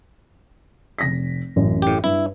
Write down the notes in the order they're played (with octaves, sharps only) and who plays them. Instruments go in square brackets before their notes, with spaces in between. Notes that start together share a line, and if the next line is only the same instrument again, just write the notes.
[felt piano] F1 A#6 B6
A1 F#2
[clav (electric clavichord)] A2 G4
[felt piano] G2 [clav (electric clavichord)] E4